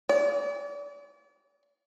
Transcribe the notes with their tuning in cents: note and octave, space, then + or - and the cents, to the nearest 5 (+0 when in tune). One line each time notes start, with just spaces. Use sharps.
D5 -40